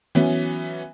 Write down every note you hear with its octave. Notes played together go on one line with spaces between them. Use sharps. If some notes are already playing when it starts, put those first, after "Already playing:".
E3 F#3 B3 C#4